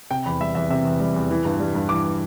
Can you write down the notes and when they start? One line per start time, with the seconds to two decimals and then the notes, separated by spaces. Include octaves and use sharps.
0.11 C3 G5
0.26 E2 B5
0.41 G3 E5
0.55 E2 E5
0.70 C3 E5
0.85 E2
1.00 G3
1.15 E2
1.31 E3
1.45 G2
1.59 G3
1.75 G2
1.89 E3 D6